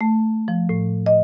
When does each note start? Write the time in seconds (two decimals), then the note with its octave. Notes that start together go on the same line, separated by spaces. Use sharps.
0.01 A3
0.48 F3
0.69 A2
1.06 D#5